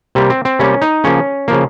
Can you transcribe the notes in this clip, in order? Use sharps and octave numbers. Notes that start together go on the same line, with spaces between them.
C3 G3 A#3
C4
C4
C3 G3 A#3 C#4
D#4
C#3 F3 A#3 C#4
C#3 F3 A#3